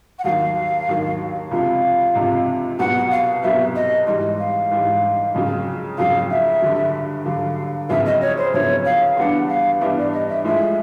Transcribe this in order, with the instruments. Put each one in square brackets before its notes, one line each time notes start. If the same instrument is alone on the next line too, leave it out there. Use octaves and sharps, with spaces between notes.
[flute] F#5
[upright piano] D#2 D#3 F#3 [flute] F5
[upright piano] D#2 D#3 F#3
[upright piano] C#2 C3 F3 [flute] F5
[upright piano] C#2 C3 F3
[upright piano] C2 B2 F#3 B3 [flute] F#5
[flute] F5
[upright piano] C2 B2 F#3 B3 [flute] E5
[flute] D#5
[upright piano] G#2 E3 G3 [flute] D#5
[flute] F5
[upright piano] G#2 E3 G3
F2 C#3 F#3
[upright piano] F2 C#3 F#3 [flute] F5
[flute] E5
[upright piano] G2 D3 F#3
[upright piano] G2 D3 F#3 [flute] F5
[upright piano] F2 C#3 F#3 B3 E4 [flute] E5
[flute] D#5
C#5
C5
[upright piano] F2 C#3 F#3 B3 E4 [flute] C#5
[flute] F5
[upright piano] G2 E3 G3 B3 D4 [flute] F#5
[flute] F5
[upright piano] G2 E3 G3 B3 D4 [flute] E5
[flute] D5
D#5
E5
[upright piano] A2 F3 G#3 [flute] E5